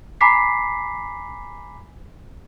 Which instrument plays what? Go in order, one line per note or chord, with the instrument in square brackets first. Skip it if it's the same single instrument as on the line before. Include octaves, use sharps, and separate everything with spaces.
[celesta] G#5 A#5 B5 D6 B6 C7